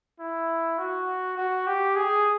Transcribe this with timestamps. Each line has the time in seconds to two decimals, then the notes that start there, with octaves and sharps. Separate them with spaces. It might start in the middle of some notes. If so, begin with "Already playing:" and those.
0.20 E4
0.79 F#4
1.38 F#4
1.67 G4
1.96 G#4